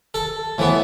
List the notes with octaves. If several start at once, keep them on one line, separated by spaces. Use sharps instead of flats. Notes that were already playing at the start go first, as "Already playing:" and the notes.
A4
A2 E3 B3